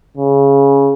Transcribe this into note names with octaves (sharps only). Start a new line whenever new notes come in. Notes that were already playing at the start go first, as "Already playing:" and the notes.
C#3